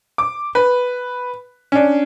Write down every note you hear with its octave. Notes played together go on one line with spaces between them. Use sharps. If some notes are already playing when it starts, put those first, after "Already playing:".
D6
B4
C#4 D4